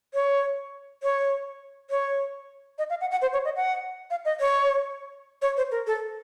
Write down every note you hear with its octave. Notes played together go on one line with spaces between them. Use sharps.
C#5
C#5
C#5
D#5
F5
F#5
F#5
C5
C#5
D#5
F#5
F5
D#5
C#5
C#5
C5
A#4
A4